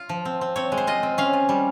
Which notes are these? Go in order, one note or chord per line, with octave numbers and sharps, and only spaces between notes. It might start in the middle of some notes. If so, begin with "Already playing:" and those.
Already playing: F4
F3
C4
C4
C4 C#5
G#3
C5
F4 D#5
C4
C#4 F5
F4
G3